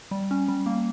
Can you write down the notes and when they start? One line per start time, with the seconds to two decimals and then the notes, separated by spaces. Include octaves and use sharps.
0.11 G3
0.31 C#4
0.48 G3
0.66 A#3